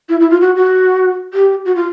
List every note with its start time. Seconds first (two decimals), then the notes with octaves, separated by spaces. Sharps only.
0.09 E4
0.20 E4
0.30 F4
0.41 F#4
0.56 F#4
1.34 G4
1.65 F#4
1.75 F4